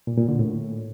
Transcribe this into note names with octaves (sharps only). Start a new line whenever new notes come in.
A#2
A#2
D3
A2